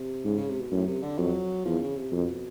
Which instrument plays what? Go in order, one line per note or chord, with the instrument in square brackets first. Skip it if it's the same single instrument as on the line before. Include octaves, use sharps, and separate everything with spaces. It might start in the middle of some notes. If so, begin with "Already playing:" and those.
Already playing: [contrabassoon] C3
[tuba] G#2 [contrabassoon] C#3
[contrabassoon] C#3
C3
B2
[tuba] F#2 [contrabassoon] A2
[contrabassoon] C3
D3
[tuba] F2 [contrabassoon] F#3
[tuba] E2 [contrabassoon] F3
[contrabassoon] C#3
C3
[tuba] F2 [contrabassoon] B2